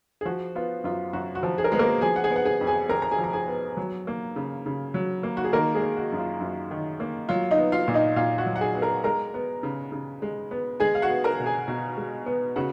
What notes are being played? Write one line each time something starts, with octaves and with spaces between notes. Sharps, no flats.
G#4
F3 F#4
B3 F4
F#2 F4
F#2 F#4
F#4
F3
G#4
A#4
G#3 B3 G#4
A#3 A#4
F3 G#4 G#5
F#5
G#4 G#5
B3
F#5
G#4 G#5
F2
G#4 G#5
F2 A#4 A#5
A#5
G#4 G#5
F3
A#5
G#4 G#5
B3
F#3
A#3
C#3
C#3
F#3
A#3
F#4
G#4
D#3 A#3 A#4
G#3 G#4
A#3
F#4
F#2
F4
F#2
D#3
A#3
F#3 F4
D#4 D#5
B3
F4 F5
A#2
D#4 D#5
A#2 F4 F5
F#4 F#5
F#3
F#5
G#4 G#5
B3
A#4 A#5
G#3 A#4 A#5
B3
C#3
C#3
G#3
B3
G#3 G#4 G#5
F5
F#4 F#5
B3
A#4 A#5
B2
G#4 G#5
B2
G#3
B3
C#3 F#4 F#5